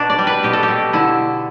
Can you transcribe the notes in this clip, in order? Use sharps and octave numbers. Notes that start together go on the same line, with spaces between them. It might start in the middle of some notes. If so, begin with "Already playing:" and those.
Already playing: B2 D4
D5
G3
B4
B2 G4
A4
G4
B2
D3 E4